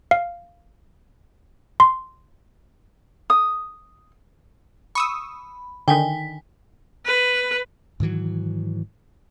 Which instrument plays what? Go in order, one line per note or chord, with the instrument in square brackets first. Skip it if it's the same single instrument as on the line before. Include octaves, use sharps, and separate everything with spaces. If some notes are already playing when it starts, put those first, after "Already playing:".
[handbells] F5
C6
[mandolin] D#6
[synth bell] B5 [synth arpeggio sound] C#6 D#6 E6
[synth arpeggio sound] D3 D#3 [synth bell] G5 G#5 B6
[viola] B4
[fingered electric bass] G#2 D#3 E3 F#3